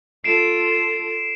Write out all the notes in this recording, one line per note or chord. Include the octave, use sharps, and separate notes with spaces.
F4 A4 C7 D7 E7